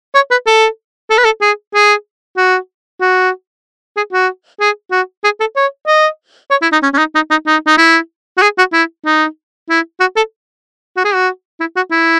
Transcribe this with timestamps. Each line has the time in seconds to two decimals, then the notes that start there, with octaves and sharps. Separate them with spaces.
0.15 C#5
0.31 B4
0.47 A4
1.10 A4
1.18 B4
1.24 A4
1.41 G#4
1.74 G#4
2.37 F#4
3.01 F#4
3.97 G#4
4.13 F#4
4.60 G#4
4.91 F#4
5.24 G#4
5.40 A4
5.56 C#5
5.88 D#5
6.51 C#5
6.62 E4
6.72 D#4
6.83 C#4
6.94 C#4
6.98 D#4
7.15 D#4
7.30 D#4
7.47 D#4
7.67 D#4
7.78 E4
8.38 F#4
8.42 G#4
8.58 F#4
8.73 E4
9.06 D#4
9.70 E4
10.00 F#4
10.16 A4
10.97 F#4
11.05 G#4
11.15 F#4
11.60 E4
11.76 F#4
11.91 E4